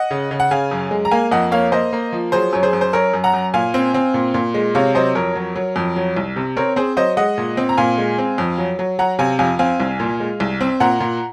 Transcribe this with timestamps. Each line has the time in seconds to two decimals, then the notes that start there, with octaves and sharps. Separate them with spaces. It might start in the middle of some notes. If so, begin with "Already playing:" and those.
Already playing: D#5 F#5
0.11 C#3
0.31 C#3
0.40 F#5
0.51 C#3 F5 G#5
0.71 F#2
0.91 G#3
1.05 A#5
1.11 A#3 F5 G#5
1.31 F2 D#5 F#5
1.51 A#3 C#5 F5
1.72 A#3 C5 D#5
1.93 A#3
2.12 F3
2.32 F#3 G#4 C5
2.53 F#2 C#5
2.63 G#4 C5
2.73 F#2
2.81 C5
2.93 F#2 A#4 C#5
3.13 F#2
3.24 F#5 A#5
3.33 F#2
3.54 A#2 F5 G#5
3.74 C4
3.94 C4
4.14 A#2
4.34 A#2
4.54 G#3
4.75 C3 C#5 F5
4.95 F#3 C5 D#5
5.15 F2 A#4 C#5
5.35 F#3
5.56 F#3
5.76 F2
5.96 F#3
6.16 C2
6.36 C3
6.57 C4 A#4 C#5
6.76 C4 G#4 C5
6.97 F#3 C5 D#5
7.17 G#3 D#5 F#5
7.38 A#2
7.57 C4
7.69 A#5
7.78 A#2 F5 G#5
7.98 G#3
8.18 C4
8.38 F2
8.58 F#3
8.79 F#3
8.99 F#3 F#5 A#5
9.19 C3 F5 G#5
9.39 F2 F5 G#5
9.59 C4 F5 G#5
9.80 C2
10.00 A#2
10.20 G#3
10.40 C2
10.61 C4
10.80 A#2 F#5 A#5
11.00 A#2